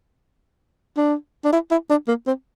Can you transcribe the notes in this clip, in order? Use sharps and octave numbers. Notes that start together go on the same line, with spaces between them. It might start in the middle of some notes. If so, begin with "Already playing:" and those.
D4
D4
E4
E4
D4
A#3
C4